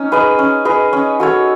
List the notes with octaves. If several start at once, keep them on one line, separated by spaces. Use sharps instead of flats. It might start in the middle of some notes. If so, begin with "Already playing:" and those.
Already playing: C#4 D#4
G#4 B4 D#5
C#4
G#4 B4 D#5
C#4
F#4 A4 C#5